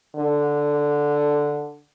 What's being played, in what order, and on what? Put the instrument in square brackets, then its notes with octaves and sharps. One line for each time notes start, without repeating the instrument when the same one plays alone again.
[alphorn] D3